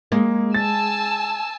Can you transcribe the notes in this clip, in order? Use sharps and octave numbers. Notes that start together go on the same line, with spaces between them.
G#3 A#3
G#5 A5 E6 A6